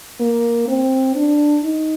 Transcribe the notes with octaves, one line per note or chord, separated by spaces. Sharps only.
A#3
C4
D4
D#4